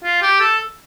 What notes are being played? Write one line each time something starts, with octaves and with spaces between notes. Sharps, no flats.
F4
G4
A4